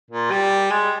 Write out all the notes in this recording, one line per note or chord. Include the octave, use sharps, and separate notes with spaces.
A#2
G3
G#3